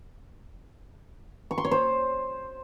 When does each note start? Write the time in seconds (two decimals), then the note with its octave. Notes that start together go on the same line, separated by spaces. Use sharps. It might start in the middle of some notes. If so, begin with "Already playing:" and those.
1.51 C#6
1.58 C6
1.65 C#5
1.71 C5